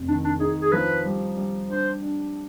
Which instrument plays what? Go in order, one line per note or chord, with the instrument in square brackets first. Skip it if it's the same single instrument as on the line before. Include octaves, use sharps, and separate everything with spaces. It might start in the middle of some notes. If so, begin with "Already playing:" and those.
Already playing: [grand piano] F1 F2
[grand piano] D#3 [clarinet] D4
[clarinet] D4
[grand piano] D#4 [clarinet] G#4
[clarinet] G#4
[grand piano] F3 [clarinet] B4
[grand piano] G3
G3
[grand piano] D4 [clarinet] C5
[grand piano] D4